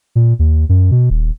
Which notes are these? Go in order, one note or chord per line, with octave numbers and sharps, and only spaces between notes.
A#2
D#2
F#2
B2
D#1